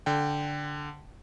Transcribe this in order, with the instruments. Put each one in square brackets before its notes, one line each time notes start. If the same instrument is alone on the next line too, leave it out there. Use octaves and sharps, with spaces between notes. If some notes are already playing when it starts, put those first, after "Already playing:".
[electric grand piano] D3 G5